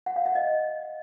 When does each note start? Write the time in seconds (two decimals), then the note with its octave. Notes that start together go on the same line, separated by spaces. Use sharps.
0.06 F#5
0.16 F5
0.26 E5
0.35 D#5